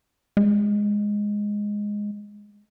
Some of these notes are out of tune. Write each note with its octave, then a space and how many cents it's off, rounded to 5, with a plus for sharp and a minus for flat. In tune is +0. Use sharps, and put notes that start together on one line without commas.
G#3 -5